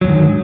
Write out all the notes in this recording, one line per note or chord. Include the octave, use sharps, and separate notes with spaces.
E2 G#2 D3 D#3 F#3